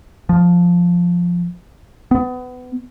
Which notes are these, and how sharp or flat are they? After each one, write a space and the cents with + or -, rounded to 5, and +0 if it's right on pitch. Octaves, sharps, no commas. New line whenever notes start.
F3 +5
B3 +25